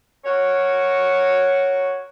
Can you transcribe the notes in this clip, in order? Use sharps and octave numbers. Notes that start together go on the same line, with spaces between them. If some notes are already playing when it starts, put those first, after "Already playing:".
F#4 A#4 C#5